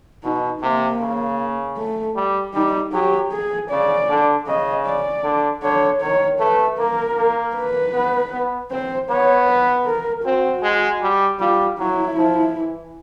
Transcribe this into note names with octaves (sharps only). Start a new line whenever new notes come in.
B2 D#4
C3 A#3
C#3
A3
G3
G3 D#4
F#3 G4
G#4
C#3 D5
D3
C#3 D#5
D5
D3
D3 C#5
D#3 C#5
A3 B4
A#3 A#4
A#3
B4
B3
B3
C4 C5
B3 C#5
B4
A#4
C4 F#4
G#3
G3
G3 F4
F#3 E4
F3
E3